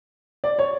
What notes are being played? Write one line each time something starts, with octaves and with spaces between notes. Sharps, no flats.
D5
C#5